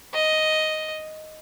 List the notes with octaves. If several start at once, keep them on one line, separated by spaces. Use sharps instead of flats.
D#5